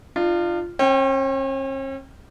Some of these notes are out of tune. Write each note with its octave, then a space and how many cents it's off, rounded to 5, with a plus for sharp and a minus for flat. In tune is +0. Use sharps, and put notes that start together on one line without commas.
D4 +40 F4 -10
C#4 -45 G5 +0